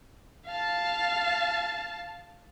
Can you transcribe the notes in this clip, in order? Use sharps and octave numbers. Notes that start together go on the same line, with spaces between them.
F5 A5